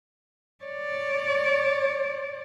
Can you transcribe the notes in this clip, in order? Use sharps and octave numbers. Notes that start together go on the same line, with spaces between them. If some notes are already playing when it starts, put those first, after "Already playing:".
C#5 D5